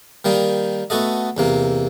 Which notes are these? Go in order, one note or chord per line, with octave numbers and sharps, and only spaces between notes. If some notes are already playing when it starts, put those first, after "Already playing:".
D#3 G3 A#3 D#4
A3 B3 F#4 A4 D#5
E2 C3 A#3